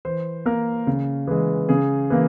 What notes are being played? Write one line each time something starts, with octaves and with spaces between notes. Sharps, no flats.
E3 C5
A#3 A#4
C#3
E3 G#3
C#3 G#4
E3 A#3